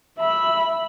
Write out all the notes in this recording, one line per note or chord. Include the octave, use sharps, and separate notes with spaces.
E5 B5